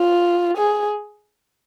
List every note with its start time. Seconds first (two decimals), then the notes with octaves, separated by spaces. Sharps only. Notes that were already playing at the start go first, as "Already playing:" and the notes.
Already playing: F4
0.57 G#4